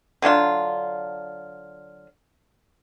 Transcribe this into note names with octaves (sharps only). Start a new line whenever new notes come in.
D3 F#3 D4 F4